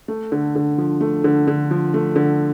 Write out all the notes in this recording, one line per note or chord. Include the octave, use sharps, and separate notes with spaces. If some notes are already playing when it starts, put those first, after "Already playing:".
A3
D3
D3
F3
A3
D3
D3
F3
A3
D3